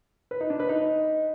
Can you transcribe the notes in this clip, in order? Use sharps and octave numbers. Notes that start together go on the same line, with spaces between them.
B4
D#4
D4
B4
D#4